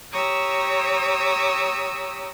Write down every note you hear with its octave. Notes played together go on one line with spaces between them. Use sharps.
G4 C#5 A#5 D#6 E6